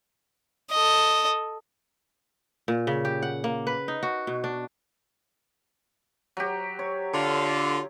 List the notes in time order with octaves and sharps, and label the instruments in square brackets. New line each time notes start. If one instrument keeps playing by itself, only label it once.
[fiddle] A4 D#5
[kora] A#2
C#3
G4
F#5
A#3
B4
D#4
F#4
B2
D4
[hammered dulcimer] F#3 G4
C#5
[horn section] D3 F4